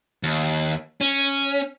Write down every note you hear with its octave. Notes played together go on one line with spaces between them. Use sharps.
D#2
C#4